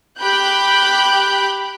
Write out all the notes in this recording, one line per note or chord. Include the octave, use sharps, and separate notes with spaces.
G4 G5 B5 F#6 G6